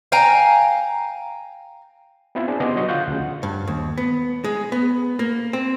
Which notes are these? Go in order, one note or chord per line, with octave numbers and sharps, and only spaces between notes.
F5 G5 G#5 A#5
B3 C4 E4 F4
D4 G#4 C5
C#3 B3 G4 D#5 C6 D6
F#3 D#5 C#6
D3 F4 F5 F#5 G6
D2 C#3
G2
D#2
B3
G#3
B3
A#3
C4